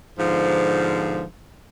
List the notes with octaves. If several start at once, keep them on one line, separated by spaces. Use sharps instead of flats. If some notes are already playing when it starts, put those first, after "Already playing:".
G#2 B2 D3 F3